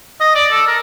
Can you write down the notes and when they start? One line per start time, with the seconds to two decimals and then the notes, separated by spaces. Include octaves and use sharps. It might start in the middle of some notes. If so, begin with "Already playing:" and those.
0.20 D#5
0.35 D5
0.51 A4
0.67 A#4